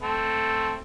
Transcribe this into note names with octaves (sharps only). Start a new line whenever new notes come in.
A3 C4